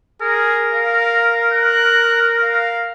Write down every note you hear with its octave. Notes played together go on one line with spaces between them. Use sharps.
G#4 A#4
F5
F#6
F5